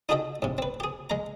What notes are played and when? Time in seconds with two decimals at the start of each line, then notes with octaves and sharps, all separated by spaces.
0.09 D#4 F#4 G#4 A4 D#5 G5
0.42 G#2 C3
0.58 C4 B4
0.80 G4 G#4
1.10 G#3 A#5